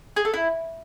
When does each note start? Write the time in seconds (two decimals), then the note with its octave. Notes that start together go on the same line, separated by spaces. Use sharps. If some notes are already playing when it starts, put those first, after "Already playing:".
0.16 G#4
0.25 A4
0.34 E4